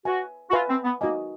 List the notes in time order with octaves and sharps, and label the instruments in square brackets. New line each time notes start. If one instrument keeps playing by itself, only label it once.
[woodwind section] F#4 [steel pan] B4 E5 G#5
[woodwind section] F#4
[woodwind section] F4 [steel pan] B4 E5 G#5
[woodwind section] C4
B3
[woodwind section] A#3 [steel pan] D#4 F#4 A#4 D#5 G#5